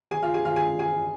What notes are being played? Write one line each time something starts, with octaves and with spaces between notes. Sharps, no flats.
G#4 G#5
F4 F5
G#4 G#5
F4 F5
G#4 G#5
G#4 G#5